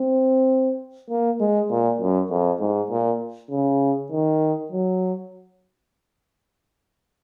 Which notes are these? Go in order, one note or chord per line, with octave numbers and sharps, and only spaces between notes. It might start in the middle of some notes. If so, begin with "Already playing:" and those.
Already playing: C4
A#3
G#3
A#2
F#2
F2
G#2
A#2
C#3
D#3
F#3